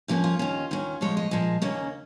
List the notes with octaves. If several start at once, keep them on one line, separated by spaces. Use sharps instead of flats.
F2 F3 A#3 C#4 D#4
F4
D#2 D#3 C#4
D#2 D#3 C#4
A#2 F3 G#3 C#5
D#5
A#2 F3 G#3
D#2 C#3 A#3 C#4